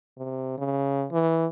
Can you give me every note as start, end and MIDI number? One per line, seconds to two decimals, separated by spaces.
0.17 0.57 48
0.58 1.06 49
1.11 1.46 52